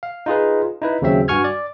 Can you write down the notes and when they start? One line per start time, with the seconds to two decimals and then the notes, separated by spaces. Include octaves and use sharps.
0.03 F5
0.26 D#4 F4 G#4 B4
0.82 D#4 E4 B4
1.02 D#2 C#3 F#3 C4 E5
1.28 G2 F#4 G#5 C#6 F6 G#6
1.44 D5